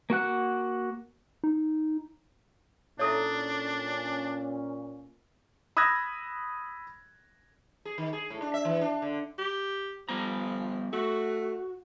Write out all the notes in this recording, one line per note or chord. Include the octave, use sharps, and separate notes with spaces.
A#3 F#4 F#5 F#6
D#4
A#2 C#4 D4 E4 A4 C#5
B5 D#6 E6 F#6 G#6 A#6
G#4
D#3
G#4
A2
D4
E5
E3
D4
D3
G4
F3 G3 B3 A#5
A3 F#4